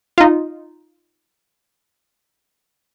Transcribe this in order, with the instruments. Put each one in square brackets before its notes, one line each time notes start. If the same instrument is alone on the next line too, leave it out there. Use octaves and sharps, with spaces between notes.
[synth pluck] D#4 F4